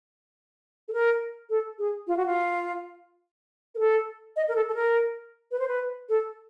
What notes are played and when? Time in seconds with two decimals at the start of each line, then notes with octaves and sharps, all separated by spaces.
0.88 A4
0.93 A#4
1.50 A4
1.79 G#4
2.07 F4
2.17 F#4
2.26 F4
3.75 A#4
3.79 A4
4.36 D#5
4.48 A#4
4.56 A4
4.69 A4
4.75 A#4
5.51 B4
5.59 C5
5.68 B4
6.09 A4